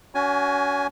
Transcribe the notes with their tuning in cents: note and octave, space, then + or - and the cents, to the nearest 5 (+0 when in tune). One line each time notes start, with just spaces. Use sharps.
C#4 +35 F#4 +10 G#5 +0